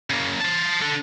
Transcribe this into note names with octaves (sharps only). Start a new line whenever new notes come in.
C#3 A#3
C5 A5
D4 A4